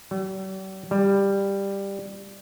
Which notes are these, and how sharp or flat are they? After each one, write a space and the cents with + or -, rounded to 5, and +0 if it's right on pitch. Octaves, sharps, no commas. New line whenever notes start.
G3 -45
G3 +10